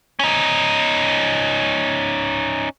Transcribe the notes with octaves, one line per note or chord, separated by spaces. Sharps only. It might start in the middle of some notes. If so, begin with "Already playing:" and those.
C#4 D#4